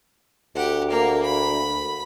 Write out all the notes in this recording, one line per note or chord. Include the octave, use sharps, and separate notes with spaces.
D2 G4 F#5
A#3 F5
B5